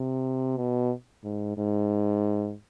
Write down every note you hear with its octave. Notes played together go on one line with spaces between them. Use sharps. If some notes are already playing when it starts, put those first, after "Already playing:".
Already playing: C3
B2
G#2
G#2